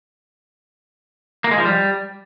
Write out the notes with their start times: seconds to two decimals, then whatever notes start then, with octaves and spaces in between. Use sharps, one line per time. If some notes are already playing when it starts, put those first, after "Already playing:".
1.44 A#3
1.51 G#3
1.58 F3
1.65 G3